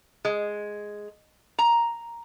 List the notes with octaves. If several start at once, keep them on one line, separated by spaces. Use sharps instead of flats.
G#3
A#5